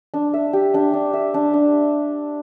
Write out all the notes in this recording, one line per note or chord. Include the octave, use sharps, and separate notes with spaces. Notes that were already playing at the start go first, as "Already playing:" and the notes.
D4
E5
G4
D4
D4
E5
D4
D4